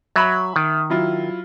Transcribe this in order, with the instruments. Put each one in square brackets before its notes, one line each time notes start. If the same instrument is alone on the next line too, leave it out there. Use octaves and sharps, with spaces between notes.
[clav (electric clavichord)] F#3 [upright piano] E5 B5
[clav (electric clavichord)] D#3
[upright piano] F#3 E4 F4